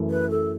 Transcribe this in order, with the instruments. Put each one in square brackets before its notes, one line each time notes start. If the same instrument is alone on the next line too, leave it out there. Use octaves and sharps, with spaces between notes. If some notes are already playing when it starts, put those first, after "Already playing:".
Already playing: [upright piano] F#2 E3 A3
[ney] B4
A4